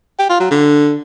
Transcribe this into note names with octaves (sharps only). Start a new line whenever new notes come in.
G4
F4
F#3
D3